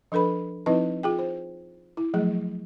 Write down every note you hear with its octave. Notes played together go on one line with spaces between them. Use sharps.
F3 D4 A4 B4 B5
F3 C4 D#4 E4 B4 D#5
F4 G#4 G5
C5
E4
F3 F#3 A3 G#4